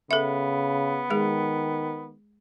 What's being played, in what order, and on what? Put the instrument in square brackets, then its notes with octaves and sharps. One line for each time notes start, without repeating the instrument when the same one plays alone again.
[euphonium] C#3 [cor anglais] B3 [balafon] A4 E5
[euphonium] D#3 [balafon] G#3 G#4